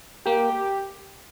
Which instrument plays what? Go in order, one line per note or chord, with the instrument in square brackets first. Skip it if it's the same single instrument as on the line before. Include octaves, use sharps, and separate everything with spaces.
[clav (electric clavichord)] A#3 [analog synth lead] G4